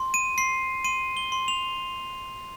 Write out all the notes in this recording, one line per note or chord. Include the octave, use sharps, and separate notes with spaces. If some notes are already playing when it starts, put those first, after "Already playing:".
Already playing: C6
D#7
C6 C7
C6 D#7
G7
C6
F7